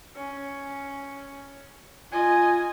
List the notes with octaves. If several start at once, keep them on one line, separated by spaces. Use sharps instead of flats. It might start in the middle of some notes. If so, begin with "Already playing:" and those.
C#4
F4 D#5 G#5